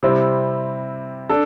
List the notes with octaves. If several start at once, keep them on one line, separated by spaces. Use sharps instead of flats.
C3 G3 C4 E4
D4 A4